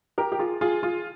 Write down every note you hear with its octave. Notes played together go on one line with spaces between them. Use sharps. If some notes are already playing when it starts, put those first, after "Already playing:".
G4 A#4
G4
F4 G#4
F4 G#4
F4 G#4